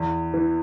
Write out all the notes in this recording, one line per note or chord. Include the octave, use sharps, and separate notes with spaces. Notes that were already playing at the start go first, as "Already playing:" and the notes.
Already playing: E2
E3